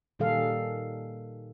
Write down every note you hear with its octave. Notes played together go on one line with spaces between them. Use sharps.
A#2 D#3 G3 G#4 A4 F5